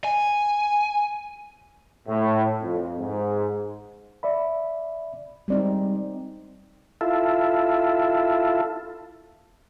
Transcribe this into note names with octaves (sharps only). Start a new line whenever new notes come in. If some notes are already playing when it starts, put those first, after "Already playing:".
G#5
A2
F2
G#2
D5 E5 B5
G3 G#3 C4 D#4 D5
E4 F4 A4